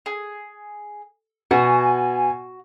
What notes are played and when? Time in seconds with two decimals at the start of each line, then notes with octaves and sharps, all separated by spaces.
0.06 G#4
1.51 B2 F#4 G#5